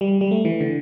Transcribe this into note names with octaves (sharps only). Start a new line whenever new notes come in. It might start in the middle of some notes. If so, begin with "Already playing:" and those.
G3
G3
A3
E3
D3